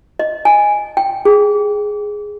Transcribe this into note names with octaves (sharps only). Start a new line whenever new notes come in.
D#5
G#5
G5
G#4